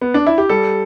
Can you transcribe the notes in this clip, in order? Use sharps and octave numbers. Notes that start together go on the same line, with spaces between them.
B3
D4
E4
G4
G3 A4